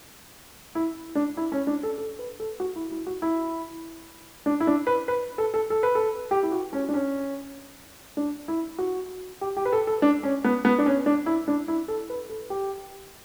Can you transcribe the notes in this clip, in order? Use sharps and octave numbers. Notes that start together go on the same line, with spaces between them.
E4
D4
E4
C#4
D4
A4
A4
B4
A4
F#4
E4
E4
F#4
E4
D4
E4
D4
B4
B4
A4
A4
A4
B4
A4
G4
E4
F#4
C#4
D4
C#4
D4
E4
F#4
G4
G4
B4
A4
A4
D4
C#4
B3
B3
D4
C#4
D4
E4
D4
E4
A4
B4
A4
G4